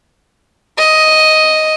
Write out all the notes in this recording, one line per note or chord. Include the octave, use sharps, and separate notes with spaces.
D#5